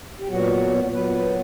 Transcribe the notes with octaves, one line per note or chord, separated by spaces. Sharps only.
G4
A#2 F#3 B3 F#4
A#2 F#3 B3 B4
B4